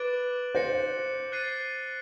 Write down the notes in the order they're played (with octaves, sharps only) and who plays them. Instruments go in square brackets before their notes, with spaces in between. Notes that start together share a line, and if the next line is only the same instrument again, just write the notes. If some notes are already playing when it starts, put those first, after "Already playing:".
Already playing: [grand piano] B4 [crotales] D6 F#6 A6 D7 F#7
[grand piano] C5 [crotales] G6 A#6 C#7
[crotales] F#6 A6 C7 D#7